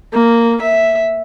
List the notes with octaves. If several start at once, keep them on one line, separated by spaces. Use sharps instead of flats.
A#3
E5